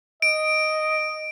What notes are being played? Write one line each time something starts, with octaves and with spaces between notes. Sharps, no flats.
D#5 D7